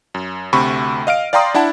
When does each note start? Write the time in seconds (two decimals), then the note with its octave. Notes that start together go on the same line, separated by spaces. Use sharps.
0.14 F#2
0.53 D2 C3 B5 C#6
1.07 D#5 F5 F6 D7
1.33 D5 F5 G5 A#5 C6 D#6
1.54 D4 E4 F#5 A5